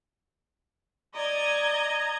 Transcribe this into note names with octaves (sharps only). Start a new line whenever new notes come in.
D5 D#5 A#5 G#6